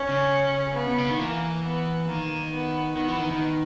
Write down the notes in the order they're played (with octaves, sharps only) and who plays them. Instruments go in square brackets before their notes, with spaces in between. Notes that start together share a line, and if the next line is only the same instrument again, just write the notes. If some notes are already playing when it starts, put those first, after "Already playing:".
Already playing: [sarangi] C#4
[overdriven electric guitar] C#3
[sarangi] B3
[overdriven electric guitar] B2
C#3
D#3
[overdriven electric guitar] E3 [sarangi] A#3
[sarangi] B3
[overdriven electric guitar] D#3 [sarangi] A#3
[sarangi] B3
[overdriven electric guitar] D#3 [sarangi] B3
[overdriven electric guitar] E3
D#3
D#3